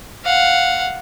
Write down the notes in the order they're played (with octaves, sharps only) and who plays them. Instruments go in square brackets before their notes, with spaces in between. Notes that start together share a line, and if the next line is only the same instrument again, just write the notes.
[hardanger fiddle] F5 F#5